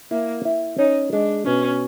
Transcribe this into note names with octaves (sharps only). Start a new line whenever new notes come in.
A#3 E4
E4
C#4 D#4
G#3 D4
B2 C#4